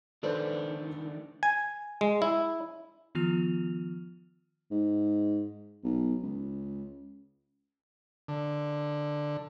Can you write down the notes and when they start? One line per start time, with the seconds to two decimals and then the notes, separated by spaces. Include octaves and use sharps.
0.23 D#3 A3 D4 A4 B4 C5
1.43 G#5
2.01 G#3
2.22 E4
3.15 D#3 F3 B3 F4 F6 F7
4.71 G#2
5.84 B1
6.23 C#2
8.28 D3